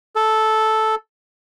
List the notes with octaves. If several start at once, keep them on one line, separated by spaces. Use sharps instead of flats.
A4